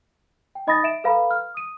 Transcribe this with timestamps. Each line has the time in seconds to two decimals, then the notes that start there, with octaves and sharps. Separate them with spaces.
0.55 G5
0.67 D#4 D#5 B5 D#6 A6 A#6
0.84 E5 D7 E7
1.04 A4 B4 F5 A#5 B5
1.31 F6
1.54 D#6 D#7